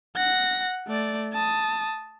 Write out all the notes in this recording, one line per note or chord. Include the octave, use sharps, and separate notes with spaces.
F#5 A#6
A3 D5
A5 D#6